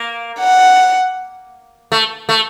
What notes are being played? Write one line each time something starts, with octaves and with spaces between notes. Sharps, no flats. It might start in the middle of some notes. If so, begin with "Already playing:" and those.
Already playing: A#3
F#5
A3
A3